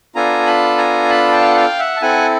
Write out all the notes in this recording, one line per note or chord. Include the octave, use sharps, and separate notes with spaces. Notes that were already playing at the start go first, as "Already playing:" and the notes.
B3 D4 F4 A4 G#5 A#5
A5 B5
G#5 A#5
A5 B5
G5 A5
F5
F#5
F5 G5
E5 F#5
A5
C4 E4 A4 F#5 G#5